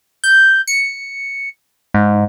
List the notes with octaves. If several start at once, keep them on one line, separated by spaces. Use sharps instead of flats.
G6
C#7
G#2